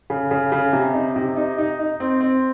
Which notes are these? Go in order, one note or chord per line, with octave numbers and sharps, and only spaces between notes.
C#3
C#3
C#3
C3
D#4
C3
D#4
D#4
D#4
C4
C4